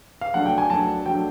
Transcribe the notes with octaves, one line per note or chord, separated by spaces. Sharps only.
F5
F#3 A3 D4 F#5
G5
G#5
F#3 A3 D4 A5
F#3 A3 D4 G5